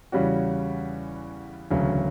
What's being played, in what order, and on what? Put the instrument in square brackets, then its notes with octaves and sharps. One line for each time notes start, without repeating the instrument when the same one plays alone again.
[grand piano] E2 C#3 G3 C#4 F#4
E1 D2 C#3 F#3